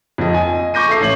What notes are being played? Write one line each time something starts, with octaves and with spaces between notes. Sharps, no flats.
F2 D#5
G#5
D#5
C#6 D6 G6 A#6 D#7
A4 E5 C7
A1 C#5 F#7